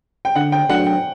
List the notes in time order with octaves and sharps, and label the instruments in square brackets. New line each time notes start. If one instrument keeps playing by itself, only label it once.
[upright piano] G5
[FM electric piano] D3 [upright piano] F#5
[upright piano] G5
[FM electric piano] F#3 A3 D4 [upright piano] F#5
[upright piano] G5